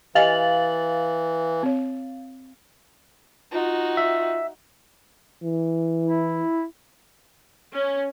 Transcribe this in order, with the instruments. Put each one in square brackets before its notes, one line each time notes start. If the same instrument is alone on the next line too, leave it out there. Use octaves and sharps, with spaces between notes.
[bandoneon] E3 [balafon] G4 D#5 G#5 [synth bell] F5 A6 F#7
[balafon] C4 C#5
[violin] D#4 F#4 [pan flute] F4
[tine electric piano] E5
[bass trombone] E3
[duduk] E4
[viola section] C#4